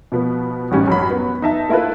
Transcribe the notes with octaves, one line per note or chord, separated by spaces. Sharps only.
B2 F3 B3
A1 G#2 G3 C#4
F#2 F#3 B5
B3
D#4 E5 A5
A#3 E4 F4 A4 B4